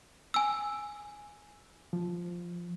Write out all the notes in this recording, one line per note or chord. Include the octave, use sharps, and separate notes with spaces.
G#5 E6
F3